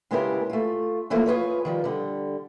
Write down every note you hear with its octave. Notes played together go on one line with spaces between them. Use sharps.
C#3 G#3 B3 E4 G4 A#4
A3 F4
E3 F3 A3 A#3 E4
F4 G#4 B4 C#5
D#3 F3 G3
D3 G3